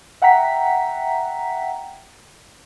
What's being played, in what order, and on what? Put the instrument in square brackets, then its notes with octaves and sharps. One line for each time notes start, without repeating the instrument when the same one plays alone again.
[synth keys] E5 F#5 G5 A#5 B6